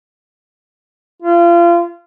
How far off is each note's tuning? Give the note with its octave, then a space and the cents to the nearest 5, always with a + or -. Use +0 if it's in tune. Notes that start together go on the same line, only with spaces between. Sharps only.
F4 -30